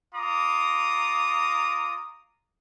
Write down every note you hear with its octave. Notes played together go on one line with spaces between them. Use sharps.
F4 A#5 D6 D#6